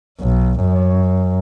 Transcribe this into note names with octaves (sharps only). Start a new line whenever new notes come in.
B1
F#2